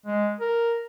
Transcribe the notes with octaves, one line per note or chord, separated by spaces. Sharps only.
G#3
A#4